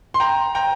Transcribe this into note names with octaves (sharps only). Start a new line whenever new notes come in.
C6
G5 A#5
G5 A#5